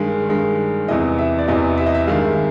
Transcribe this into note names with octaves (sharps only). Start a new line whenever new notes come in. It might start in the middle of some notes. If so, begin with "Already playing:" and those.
Already playing: G2 D#3 G#3
G2 D#3 G#3
E2 C3 E3 D#5
E5
D5
E2 C3 E3 D#5
E5
D#5
E5
G2 D#3 G#3 F5